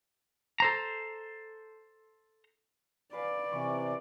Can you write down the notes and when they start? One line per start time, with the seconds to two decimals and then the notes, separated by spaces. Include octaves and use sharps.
0.60 A4 C5 A#5
3.13 B4 D5 F5 G#5
3.52 C3 E3 C#6